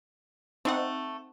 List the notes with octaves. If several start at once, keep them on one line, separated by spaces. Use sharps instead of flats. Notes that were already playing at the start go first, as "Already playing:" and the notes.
A3 C4 D#4 F#5